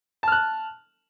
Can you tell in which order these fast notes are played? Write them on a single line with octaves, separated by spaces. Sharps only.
A5 F6 F#6